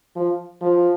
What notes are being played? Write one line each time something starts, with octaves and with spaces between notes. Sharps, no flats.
F3
F3